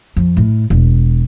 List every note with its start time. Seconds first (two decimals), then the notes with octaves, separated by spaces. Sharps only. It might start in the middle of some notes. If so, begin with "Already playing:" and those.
0.16 F2
0.37 A2
0.70 E1